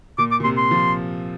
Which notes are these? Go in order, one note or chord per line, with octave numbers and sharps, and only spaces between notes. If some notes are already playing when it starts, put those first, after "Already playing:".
A#2 D6
D6
A#2
C3 C6
C6
F3